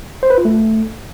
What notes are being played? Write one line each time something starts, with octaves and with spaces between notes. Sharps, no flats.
C5
B4
F4
A3